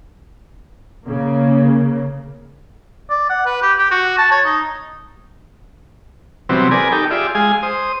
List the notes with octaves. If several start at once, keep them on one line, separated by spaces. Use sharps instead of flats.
C#3 A#3
D5
F#5
B4
G4
G4
F#4
A5
C#5
D#4
C3 E3 F#3 G3 B3 C4
G#4 A#4 B4 D5 G#5
D#4 G4 A4 G5
F4 G4 G#4 D5 E5
G#3 G#4 F5 G#5
C5 D#6